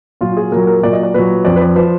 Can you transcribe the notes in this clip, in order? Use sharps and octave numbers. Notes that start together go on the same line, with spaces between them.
A#2 F#3 F4
G#4
A#2 F#3 A#4
A#4
A#2 F#3 D5
D#5
D5
A#2 F#3 B4
F2 F3 D5
B4
D5
F3 B4